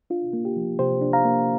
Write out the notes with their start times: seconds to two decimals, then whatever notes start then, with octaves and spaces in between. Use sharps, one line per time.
0.10 D4 F4
0.33 A#3
0.45 G4
0.56 F3
0.79 C3 G4 C5
1.01 D4
1.13 F5 A#5
1.25 A#3